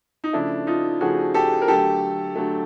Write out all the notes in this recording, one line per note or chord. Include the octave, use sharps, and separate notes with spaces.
D#4
C#3 F3 A3 D4 E4
D#4 F4
C#3 F3 A3 F#4 G#4
G4 A4
A#4
D3 F#3 A3 G4 A4
D3 F#3 A3